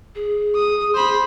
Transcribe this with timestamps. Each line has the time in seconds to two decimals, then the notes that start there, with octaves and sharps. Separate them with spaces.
0.15 G#4
0.55 D#6
0.95 C5 B5